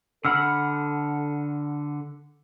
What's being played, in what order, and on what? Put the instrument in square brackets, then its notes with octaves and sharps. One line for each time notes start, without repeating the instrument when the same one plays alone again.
[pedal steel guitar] D3 F#5 B5 [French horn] A4 [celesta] E6 F6